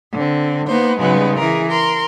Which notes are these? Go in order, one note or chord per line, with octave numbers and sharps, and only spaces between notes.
D3 C4
A#3 B3 D#4 C5
C#3 G3 G#3 B3 D#4
E3 G#4 A#4
A#4 C6